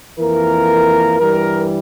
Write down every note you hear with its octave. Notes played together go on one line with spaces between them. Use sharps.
F2 E3 A#3 A#4
G2 E3 G3 A#4